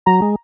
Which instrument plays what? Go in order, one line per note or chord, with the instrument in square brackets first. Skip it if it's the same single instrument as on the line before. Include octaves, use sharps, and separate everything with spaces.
[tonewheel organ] F#3 [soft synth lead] A#5
[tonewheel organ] G#3